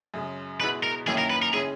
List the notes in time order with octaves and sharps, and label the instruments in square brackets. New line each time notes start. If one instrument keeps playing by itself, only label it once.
[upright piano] F#2 C#3 G#3
[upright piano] B2 G#3 B3 E4 [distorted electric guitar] B4
[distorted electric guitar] A#4
[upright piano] F#2 D#3 A#3 C#4 E4 [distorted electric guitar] G#4
[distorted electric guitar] A#4
B4
A#4
[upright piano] C#3 G#3 C#4 E4 [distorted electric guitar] G#4